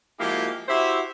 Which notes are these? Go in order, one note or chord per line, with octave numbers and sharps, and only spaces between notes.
F3 G#3 A#3 E4 F#4 G4
E4 F#4 G4 C5 E5